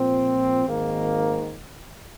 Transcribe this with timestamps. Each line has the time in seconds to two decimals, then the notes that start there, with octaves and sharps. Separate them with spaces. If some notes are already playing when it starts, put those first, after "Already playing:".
Already playing: A#2 F3 C4
0.65 G#1 G#2 D#3 A#3